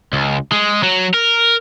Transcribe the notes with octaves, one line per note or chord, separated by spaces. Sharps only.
C#2
G#3
F#3
A#4